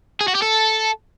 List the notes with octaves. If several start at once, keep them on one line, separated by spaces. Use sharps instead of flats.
G#4
F#4
G4
A4